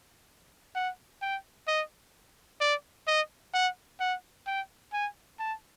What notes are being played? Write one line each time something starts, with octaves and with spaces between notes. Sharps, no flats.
F#5
G5
D#5
D5
D#5
F#5
F#5
G5
G#5
A5